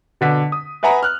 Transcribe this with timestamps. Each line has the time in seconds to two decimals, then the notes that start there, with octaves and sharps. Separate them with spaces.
0.21 B2 D3 B6
0.52 D#6
0.83 B4 E5 F#5 G#5 A#5
1.03 F6 F#6